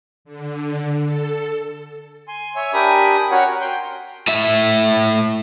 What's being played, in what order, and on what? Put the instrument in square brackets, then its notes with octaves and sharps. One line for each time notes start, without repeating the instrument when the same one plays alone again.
[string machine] D3
A4
[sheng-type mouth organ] G#5 C6
C#5 E5 G#5
D4 G4 A#4 G#5 B5 D#6
C#4 F#4 A#4 C#5 F#5
A#4
G5 C6
[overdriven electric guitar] A2 E5